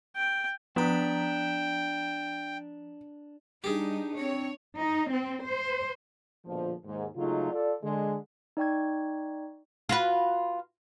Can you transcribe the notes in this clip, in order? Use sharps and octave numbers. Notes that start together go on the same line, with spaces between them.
G5
F3 B3 D4 G5 A#5 B6
G3 D4 D#4 G4 G#4
C4 C#5
D#4
C4
C5
A#1 B2 D3 F3
D#2 G#2
C#3 F#3 G#3 A3 D#4 F4
F4 A4 D5
D3 G#3
D#4 D5 G5 C#6 G#6
F4 F#4 B4